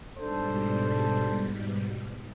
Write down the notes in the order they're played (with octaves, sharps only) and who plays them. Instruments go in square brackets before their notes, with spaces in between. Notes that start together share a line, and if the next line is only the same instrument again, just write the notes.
[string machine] G#2 B2 G3 [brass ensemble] D4 A4 C5